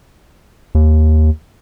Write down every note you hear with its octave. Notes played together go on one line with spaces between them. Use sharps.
D#2